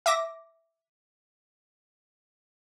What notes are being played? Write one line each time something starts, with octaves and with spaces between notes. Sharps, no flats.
E5 D6 A#6